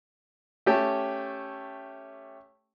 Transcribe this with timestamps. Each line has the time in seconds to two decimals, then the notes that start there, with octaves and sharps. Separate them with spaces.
0.66 A3 C#4 G4 G5 A5